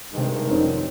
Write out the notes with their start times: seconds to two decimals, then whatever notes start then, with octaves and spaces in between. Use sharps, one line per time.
0.13 G2 C3 D#3 G#3
0.50 F1 C4 C#4 D#4